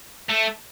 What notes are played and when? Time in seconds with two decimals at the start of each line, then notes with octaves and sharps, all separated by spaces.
0.29 A3